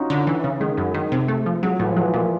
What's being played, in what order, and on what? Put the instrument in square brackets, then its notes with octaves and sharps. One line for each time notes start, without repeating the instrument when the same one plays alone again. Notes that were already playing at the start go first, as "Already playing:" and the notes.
Already playing: [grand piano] C#4 D#4 F4 F#4
[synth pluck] D3
E3
C#3
[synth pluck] D#3 [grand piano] G#3
[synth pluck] F#2
D#3
C3
A3
F3
[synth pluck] F#3 [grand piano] G#3
[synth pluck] A2 [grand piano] E3
[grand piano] F3
[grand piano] E3 [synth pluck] F#3
[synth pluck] A#2 [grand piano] F3